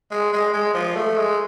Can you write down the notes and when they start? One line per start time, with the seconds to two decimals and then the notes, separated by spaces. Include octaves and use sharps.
0.11 G#3
0.33 G#3
0.53 G#3
0.74 F3
0.95 A3
1.16 G#3